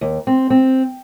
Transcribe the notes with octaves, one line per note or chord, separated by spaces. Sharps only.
D#2
C4
C4